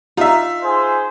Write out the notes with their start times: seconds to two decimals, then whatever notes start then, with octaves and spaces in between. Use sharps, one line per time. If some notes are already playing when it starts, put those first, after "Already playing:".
0.17 D#4 F4 E5
0.62 G#4 C5